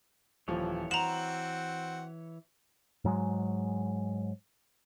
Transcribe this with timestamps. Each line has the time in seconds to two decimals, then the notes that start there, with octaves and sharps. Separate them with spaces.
0.48 D#1 E3 F3 C#5
0.91 C4 F#4 F#5 A#5 E7 F#7
3.04 G#2 F#3 G#3